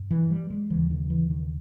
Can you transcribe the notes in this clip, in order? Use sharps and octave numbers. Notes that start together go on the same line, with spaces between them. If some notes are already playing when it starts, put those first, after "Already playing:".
Already playing: G2
E3
G3
G#3
D#2 C#3 E3
D#3
E3
D#3